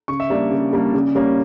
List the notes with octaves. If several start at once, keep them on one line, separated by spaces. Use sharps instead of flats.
C#3 C#6
E5
G3 A#3 D4 D5
C#3
G3 A#3 D4
C#3
G3 A#3 C#4